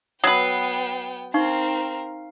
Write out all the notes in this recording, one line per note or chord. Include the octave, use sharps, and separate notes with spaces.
F#3 B3 B4 G5 D#6 C7
C4 D#4 A#4 F5 C#6